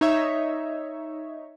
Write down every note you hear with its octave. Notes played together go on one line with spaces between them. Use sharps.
D#4 C#5 E5